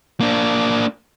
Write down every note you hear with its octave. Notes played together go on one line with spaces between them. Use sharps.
A#3 D4